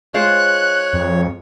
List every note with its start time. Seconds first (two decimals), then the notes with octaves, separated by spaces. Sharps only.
0.14 G#3 F4 C5 C#5 F#6
0.93 F2